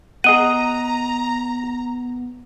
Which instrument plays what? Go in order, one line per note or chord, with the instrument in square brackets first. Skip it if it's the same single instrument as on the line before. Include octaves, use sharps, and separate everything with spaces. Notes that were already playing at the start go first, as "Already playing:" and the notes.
[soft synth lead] B3 [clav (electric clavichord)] G#4 D#5 F#5 [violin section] A#5 [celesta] D#7